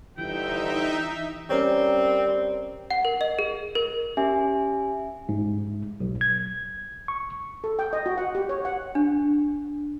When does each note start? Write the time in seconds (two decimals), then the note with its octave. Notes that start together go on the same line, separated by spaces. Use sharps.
0.18 G1 E3 D#4 E5 G5
1.50 G3 C4 C#4 A#4 C#5
2.91 F#5
3.05 A#4
3.21 D#5
3.39 G#4
3.75 A#4
4.17 C#4 G4 E5 G#5
5.29 G#2
6.00 B1
6.21 G#6
7.08 C#6
7.64 A4
7.79 G5
7.93 D#5
8.06 F#4
8.18 F#5
8.35 G4
8.49 C#5
8.65 F#5
8.95 D4